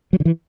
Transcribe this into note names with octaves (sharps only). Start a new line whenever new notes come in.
F#3
D3
E3